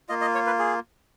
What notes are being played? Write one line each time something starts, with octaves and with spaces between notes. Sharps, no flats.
A#3 F4 D#5
D#5
C#5
B4
G#4